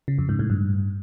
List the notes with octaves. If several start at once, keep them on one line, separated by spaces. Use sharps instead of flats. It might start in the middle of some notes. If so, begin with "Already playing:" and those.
C#3
F2
G#2
A2
G2